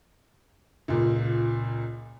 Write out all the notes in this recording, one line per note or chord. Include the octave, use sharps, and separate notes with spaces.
C#2 A#2